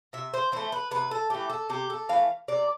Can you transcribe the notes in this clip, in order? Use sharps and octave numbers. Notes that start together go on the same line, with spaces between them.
C3 E5
C5
E3 A3 C5
B4
C3 B4
A4
E3 A3 G4
A4
C3 G4
A4
E3 A3 F5
C3 D5